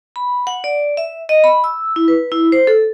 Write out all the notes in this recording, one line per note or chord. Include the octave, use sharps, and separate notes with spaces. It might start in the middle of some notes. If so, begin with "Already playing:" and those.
B5
F#5
D5
E5
D#5
B5
E6
E4
B4
E4
C5
A4